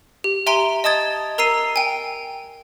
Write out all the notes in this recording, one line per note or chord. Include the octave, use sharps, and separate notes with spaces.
G4
E5 G#5 A#5 C6 D7 G7
D#5 A5 D#6 G#6 A6
A#4 A#5 E6 C7 D#7
G5 G#5